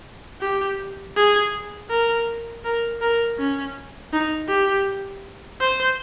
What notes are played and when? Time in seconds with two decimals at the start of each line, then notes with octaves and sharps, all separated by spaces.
0.42 G4
1.17 G#4
1.90 A#4
2.65 A#4
3.01 A#4
3.39 C#4
4.13 D#4
4.49 G4
5.61 C5